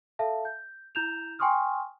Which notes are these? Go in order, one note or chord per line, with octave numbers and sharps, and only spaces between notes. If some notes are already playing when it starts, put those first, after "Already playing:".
A4 E5 F5 A5
G6
E4 A#5 G6 E7 F7
G5 G#5 C6 C#6 D#6 F6